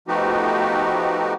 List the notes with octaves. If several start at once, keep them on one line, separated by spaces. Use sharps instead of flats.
F3 A3 B3 D#4 F#4 G4